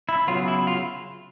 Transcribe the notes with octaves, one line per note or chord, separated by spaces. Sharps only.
E4
C#3 F#3 B3 F4
E4
F4